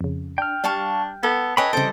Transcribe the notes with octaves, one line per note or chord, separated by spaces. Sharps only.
F2 C#3
D4 G5 F6
G3 D4 F5 A5 C#6
B3 A4
C#4 A4 B4 C#5 D#5 G5 B5
C#3 E3 G3 C4 A4 C5 D#5 D7